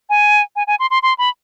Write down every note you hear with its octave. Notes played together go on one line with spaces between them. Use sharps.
G#5
G#5
G#5
C6
C6
C6
B5